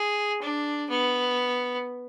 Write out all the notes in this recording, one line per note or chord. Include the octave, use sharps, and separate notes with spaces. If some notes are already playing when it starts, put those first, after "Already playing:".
Already playing: G#4
D4
B3